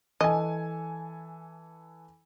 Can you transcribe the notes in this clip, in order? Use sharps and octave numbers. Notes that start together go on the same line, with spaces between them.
E3 A4 D#5 G#5